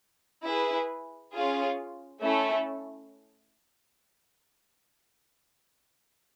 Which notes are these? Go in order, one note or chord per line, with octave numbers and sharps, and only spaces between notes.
E4 G#4 B4
C#4 F4 G#4
A3 C#4 E4 A4